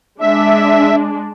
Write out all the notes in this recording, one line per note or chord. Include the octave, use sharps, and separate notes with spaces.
G#3 D4 E5